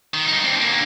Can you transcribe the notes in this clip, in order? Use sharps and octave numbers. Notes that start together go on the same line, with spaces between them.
D#3
G2 D#4
C4 D4
D3 A#3